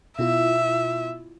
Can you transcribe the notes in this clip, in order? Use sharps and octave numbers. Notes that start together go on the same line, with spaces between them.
B2 E4 F4 E5